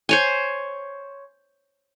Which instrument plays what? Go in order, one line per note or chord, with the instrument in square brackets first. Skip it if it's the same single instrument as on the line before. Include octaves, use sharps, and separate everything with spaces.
[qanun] C5 C#5 G#5